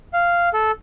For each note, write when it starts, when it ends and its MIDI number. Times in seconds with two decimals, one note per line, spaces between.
0.13 0.49 77
0.54 0.72 69